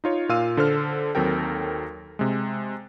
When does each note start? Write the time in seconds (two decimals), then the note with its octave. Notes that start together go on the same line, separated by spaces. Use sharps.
0.04 D#4 F4 C#5
0.29 A#2 F4 F5 E6 D#7
0.57 D3 A4 C5 F6
1.15 D#2 F#3 C4 A4 A#4 G5
2.19 C3 G#3